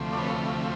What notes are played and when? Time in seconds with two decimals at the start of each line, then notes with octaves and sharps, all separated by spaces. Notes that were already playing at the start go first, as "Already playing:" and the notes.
Already playing: D2 C3 F3 A3
0.13 D5
0.17 B4 C#5